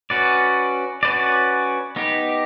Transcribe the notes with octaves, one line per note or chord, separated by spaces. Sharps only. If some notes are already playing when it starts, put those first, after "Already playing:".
C#4 F#4 B4 D5
C#4 F#4 B4 D5
B3 D#4 G4